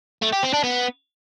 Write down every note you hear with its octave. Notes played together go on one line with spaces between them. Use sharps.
A3
G4
C4
D4
B3